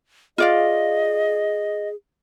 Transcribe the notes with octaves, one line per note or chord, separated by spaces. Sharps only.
F4 G#4 D5 D#5 F5